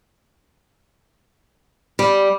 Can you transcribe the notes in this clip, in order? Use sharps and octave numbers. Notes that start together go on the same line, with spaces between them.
G3